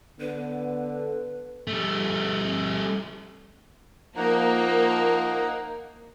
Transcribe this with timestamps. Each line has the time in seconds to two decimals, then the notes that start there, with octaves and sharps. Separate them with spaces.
0.20 D3 B3 B4
1.67 G3 A3
4.17 F3 A#3 D#4 F#5 A#5